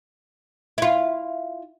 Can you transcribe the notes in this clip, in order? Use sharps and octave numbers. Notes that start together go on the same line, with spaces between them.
E4 F4